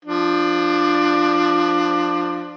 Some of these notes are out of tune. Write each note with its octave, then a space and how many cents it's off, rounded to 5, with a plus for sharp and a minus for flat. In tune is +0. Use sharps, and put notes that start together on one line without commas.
F3 +0 D4 +20